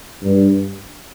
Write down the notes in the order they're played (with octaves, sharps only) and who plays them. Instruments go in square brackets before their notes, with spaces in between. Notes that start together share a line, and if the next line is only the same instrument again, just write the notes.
[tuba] G2